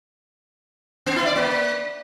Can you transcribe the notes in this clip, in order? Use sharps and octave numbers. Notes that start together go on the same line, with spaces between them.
B3
E4
D5
A#3